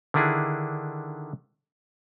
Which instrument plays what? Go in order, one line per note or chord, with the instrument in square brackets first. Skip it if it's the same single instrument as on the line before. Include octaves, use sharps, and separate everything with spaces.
[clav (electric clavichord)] D3 D#3 D4 E4 G#4